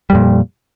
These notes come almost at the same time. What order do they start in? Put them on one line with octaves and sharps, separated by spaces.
G3 F2 A#2